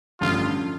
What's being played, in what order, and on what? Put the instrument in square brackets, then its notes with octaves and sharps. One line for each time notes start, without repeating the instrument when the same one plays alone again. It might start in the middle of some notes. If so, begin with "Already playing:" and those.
[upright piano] A1 G2 D3 F3 [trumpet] F4